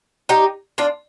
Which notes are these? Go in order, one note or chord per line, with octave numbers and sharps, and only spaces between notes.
D#4 G4
D4 F4